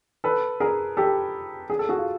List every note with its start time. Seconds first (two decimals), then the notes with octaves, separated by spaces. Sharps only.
0.24 A4 B4
0.60 G#4 A#4
0.97 G4 A4
1.70 G#4
1.79 A4
1.89 F#4 G#4
1.98 F4